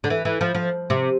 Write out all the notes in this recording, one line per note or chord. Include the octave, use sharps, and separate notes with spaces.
D3
E3
E3
F3
F3
C3